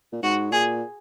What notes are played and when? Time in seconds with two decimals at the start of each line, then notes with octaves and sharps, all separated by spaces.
0.12 A#2
0.22 G#2 F#4
0.52 A#2 G#4